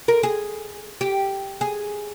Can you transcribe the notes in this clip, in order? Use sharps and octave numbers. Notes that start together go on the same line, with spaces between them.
A#4
G#4
G4
G#4